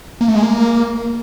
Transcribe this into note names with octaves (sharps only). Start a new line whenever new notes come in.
A#3
A3
G#3
A#3